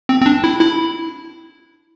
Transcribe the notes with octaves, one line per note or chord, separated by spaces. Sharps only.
C4
C4
D4
E4
E4